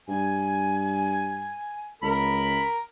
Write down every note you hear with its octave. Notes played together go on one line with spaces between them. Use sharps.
G2 G#5
C#2 A#4 B5